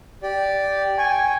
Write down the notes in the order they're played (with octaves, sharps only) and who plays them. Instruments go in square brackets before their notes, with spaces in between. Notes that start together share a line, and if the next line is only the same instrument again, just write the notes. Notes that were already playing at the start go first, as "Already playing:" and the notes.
[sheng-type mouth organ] G4 D5
[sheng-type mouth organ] G5 C#6 [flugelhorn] G#5